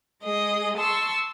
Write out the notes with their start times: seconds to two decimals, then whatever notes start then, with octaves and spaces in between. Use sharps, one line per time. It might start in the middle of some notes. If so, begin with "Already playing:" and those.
0.22 G#3 G#4 D#5
0.77 A5 C6 C#6 E6